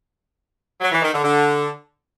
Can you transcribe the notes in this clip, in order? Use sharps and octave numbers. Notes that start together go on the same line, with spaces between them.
F#3
E3
D#3
D3
D3